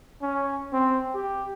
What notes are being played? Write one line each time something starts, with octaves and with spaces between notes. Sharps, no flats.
C#4
C4
G4